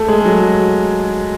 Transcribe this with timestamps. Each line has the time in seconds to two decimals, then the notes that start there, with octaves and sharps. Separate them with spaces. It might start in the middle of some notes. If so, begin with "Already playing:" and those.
Already playing: A3
0.08 G#3
0.25 F#3